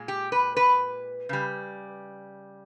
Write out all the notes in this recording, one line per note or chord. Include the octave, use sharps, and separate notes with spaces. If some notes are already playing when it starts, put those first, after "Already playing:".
Already playing: A#2 G#3
G4
B4
B4
C#3 G3